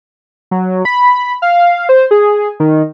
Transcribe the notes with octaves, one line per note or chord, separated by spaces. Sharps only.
F#3
B5
F5
C5
G#4
D#3